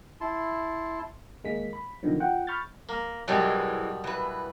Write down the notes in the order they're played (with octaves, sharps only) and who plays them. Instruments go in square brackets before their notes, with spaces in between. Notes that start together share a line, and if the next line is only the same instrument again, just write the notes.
[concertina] E4 A5 C6
[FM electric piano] D#2 G#3 A#3 B6
B5
B2 D3 D#3 F3 F#3
F4 F#5 G5
B5 C#6 F6 G6 A6
[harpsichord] A#3
[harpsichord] F#2 B2 G3 [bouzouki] E3 G#3 C4
[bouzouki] E3 B4